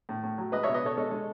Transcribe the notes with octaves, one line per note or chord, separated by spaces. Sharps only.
A2
A2
F#3
G#3 B4 D#5
B2 C#5 E5
B4 D#5
B2 A4 C#5
G#3 A4 C#5
G#3